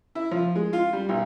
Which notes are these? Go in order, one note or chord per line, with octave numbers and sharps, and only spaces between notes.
E4
F3
G#3
F4
G3
B1